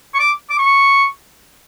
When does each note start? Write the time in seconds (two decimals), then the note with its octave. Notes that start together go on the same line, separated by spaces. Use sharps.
0.14 C#6
0.19 D6
0.50 D6
0.59 C#6